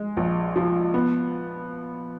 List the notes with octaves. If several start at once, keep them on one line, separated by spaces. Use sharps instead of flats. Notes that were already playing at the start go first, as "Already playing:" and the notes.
Already playing: G#3
A#1
F3
B3